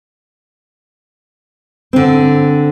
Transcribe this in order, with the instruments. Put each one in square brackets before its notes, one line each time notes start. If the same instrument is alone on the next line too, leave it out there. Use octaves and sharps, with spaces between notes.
[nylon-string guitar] D3 C4